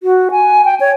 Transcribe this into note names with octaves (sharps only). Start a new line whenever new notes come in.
F#4
G#5
G5
C#5